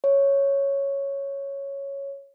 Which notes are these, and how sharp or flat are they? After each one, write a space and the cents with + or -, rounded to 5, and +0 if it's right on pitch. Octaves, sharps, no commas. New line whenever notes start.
C#5 +0